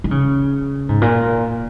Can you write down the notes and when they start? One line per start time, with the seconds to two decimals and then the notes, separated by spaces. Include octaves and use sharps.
0.04 D#3
0.11 C#3
0.89 G#2
1.02 A#2